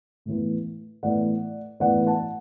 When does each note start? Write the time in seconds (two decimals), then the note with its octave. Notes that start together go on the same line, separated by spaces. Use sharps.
0.26 A2 E3 B3
1.03 A2 E3 B3 D5 F#5
1.80 A2 E3 B3 D5 F#5
2.07 F#5 A5